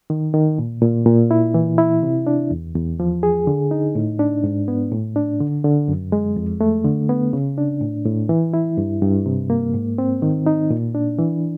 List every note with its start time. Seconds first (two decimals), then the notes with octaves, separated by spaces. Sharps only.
0.10 D#3
0.34 D#3
0.59 A#2
0.82 A#2
1.06 A#2
1.31 E4
1.54 E3
1.78 E4
2.03 C3
2.27 D4
2.51 E2
2.75 E2
3.00 F3
3.23 G#4
3.47 D3
3.71 D#4
3.95 A2
4.19 D4
4.44 G#2
4.68 B3
4.92 A2
5.16 D4
5.40 D3
5.64 D3
5.88 F#2
6.12 G#3
6.36 F2
6.61 A3
6.85 D3
7.09 B3
7.33 C#3
7.58 D4
7.81 A2
8.05 A2
8.29 E3
8.54 E4
8.77 G2
9.02 G2
9.26 C3
9.50 A#3
9.74 G#2
9.98 C4
10.22 D#3
10.46 D#4
10.70 A#2
10.95 D4
11.19 E3